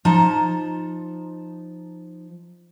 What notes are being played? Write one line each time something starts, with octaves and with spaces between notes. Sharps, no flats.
F3 D#4 A5 A#5